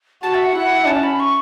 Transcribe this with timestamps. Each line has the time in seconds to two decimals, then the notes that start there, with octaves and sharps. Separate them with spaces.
0.23 F#4 A5
0.34 E5
0.44 F#5
0.56 E4
0.87 C#4 A5
1.03 B5
1.20 C#6